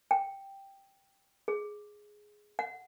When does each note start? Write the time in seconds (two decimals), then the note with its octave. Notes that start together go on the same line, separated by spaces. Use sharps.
0.11 G5
1.48 G#4
2.59 F#5